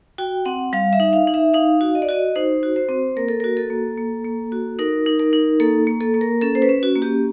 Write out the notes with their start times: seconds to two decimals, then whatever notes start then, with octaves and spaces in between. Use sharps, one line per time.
0.18 F#4 G5
0.45 C4 F#5
0.73 G3 F5
0.93 E5
1.00 D#4
1.13 F5
1.27 D#4
1.34 E5
1.54 D#4 F5
1.81 F#4
1.95 D#5
2.02 D5
2.09 F#4 D#5
2.36 D#4 C5
2.63 F#4
2.76 C5
2.89 C4
3.16 A#3 A#4
3.29 A4
3.40 F#4 A#4
3.57 A4
3.70 A#3
3.98 A#3
4.25 A#3
4.52 F#4
4.79 D#4 A#4
5.06 D#4
5.19 A#4
5.33 D#4
5.60 A#3 A4
5.87 A#3
6.01 A4
6.14 A#3
6.21 A#4
6.41 C#4 A4
6.55 C5
6.62 B4
6.69 C#4
6.83 F#4
6.95 A#3
7.02 G4